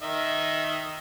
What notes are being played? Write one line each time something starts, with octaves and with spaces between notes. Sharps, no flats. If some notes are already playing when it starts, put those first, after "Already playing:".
D#3 D#5 E5